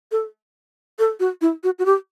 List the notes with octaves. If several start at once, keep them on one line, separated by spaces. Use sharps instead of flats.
A4
A4
F#4
E4
F#4
F#4
G4